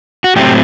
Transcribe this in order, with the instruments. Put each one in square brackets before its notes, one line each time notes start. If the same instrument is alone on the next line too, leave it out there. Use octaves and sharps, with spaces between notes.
[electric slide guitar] F#4
A2 F#3 A3 C4 G4